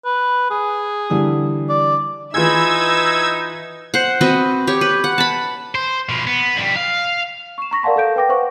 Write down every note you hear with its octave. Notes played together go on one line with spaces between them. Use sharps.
B4
G#4
D3 E3 G3
D5
E3 D#4 F4 G#4 B4 E5 E6 G#6
C5 F#5
C4 F#4 B4 D#5
G4 C#5
B4
F#5
A5 B5
C5
B2 F3
B3
F2 G3
F5
C#6 E7
A#5 C#6 A#6 B6
A#4 D5 F5 F#5 A5 C6
A4 F5 G6 D7
B4 G5 D6 A#6
B4 C5 F#5 C#6